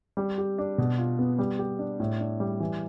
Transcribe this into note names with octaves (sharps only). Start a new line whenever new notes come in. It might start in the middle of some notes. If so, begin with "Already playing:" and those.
G3
G4
D4
B2
F4
B3
G3
G4
D4
A2
D4
G3
E3